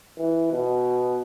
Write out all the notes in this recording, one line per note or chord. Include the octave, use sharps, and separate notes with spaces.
E3
B2